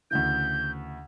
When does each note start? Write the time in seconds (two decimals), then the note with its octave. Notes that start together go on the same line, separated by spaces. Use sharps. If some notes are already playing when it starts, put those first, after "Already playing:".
0.11 D2 C#3 E3 G6